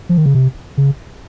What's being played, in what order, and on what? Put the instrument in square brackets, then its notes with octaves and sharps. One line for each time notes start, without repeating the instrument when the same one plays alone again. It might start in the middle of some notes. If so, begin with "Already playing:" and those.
[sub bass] F3
D#3
C#3
C3
C#3